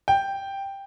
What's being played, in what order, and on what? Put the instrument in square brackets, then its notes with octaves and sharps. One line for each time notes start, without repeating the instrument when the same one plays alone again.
[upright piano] G5